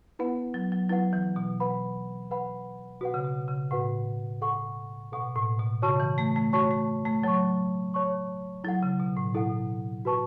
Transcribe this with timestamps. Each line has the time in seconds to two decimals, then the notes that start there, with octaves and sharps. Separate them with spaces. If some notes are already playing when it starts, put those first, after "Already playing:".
0.19 B3 E4 B4 F#5
0.54 F#3
0.72 F#3
0.89 F#3 E4 B4 F#5
1.13 E3
1.36 B2
1.60 B4 F#5 B5
2.31 B4 F#5 B5
3.01 B2 F#4 B4 F#5
3.14 C#3
3.25 B2
3.48 C#3
3.71 A2 F#4 B4 F#5
4.41 A4 F#5 C#6
5.12 B2 A4 F#5 C#6
5.36 A2
5.60 B2
5.82 C#3 F#4 C#5 A5 C#6
6.00 E3
6.18 A3
6.36 A3
6.53 A3 F#4 C#5 A5 C#6
6.71 A3
7.06 A3
7.23 F#3 C#5 A5 C#6
7.94 C#5 A5 C#6
8.64 F#3 E4 A4 F#5
8.83 C#3
9.00 B2
9.17 A2
9.34 B2 E4 A4 F#5
10.05 F#4 B4 A5 C#6